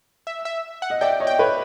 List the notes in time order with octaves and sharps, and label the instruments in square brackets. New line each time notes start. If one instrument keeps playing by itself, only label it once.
[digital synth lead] E5
E5
F#5
[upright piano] D#5
[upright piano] D5 E5 [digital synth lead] G5
[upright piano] C#5 D#5
[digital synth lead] G5
[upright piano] B4 C#5